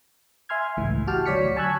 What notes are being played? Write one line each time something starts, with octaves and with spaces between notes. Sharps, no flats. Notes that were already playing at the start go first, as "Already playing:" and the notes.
E5 G#5 C6 F6 G#6
G#1 C#2 A2 E3
F#4 G4 G5 A5 F6
D2 F#3 C#5 D5 B6 C#7
G#5 A5 C#6 E6 F#6 G#6